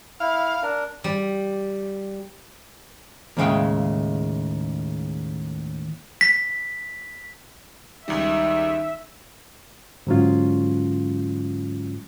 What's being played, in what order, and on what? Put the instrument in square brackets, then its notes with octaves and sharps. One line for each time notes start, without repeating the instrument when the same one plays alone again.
[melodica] E4 [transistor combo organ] F5
[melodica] D4 A#4
[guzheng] G3
[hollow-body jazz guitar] D#2 A2 C#3 G#3 F5 G5
[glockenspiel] B6
[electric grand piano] C#2 G3 [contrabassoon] D#3 [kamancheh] E5
[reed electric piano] G#2 D3 F#3 G#3 C#4 F4